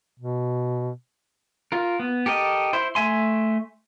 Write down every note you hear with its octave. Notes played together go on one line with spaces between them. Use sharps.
B2
F4 A#4
B3
G4 A4 A#4 D#5
E4 C5
A3 E5 G#5 C6